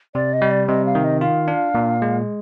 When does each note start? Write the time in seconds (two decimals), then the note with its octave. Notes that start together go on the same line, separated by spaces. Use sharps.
0.15 C3 D5
0.33 D#5
0.42 G3
0.51 D5
0.68 C3 D#5
0.86 F5
0.95 D#3
1.04 D#5
1.21 F4 F5
1.48 D4
1.75 A#2
2.02 G#3